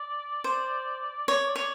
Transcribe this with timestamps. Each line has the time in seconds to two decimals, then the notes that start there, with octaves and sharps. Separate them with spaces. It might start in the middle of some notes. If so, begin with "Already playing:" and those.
Already playing: D5
0.44 C5
1.28 C#5
1.56 C#5